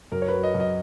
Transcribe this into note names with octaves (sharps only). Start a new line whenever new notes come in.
F#2 A#4
C#5
B4
F#3
D#5
F#2
D#5